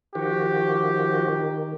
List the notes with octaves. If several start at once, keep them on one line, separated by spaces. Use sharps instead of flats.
D#3 F3 F#4 G4
D#3